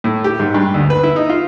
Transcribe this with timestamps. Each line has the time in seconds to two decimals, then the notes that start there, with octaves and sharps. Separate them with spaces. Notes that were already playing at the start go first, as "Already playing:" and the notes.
0.04 A2
0.24 G4
0.40 G#2
0.54 G2
0.74 D2
0.90 B4
1.03 E4
1.16 D#4
1.29 F4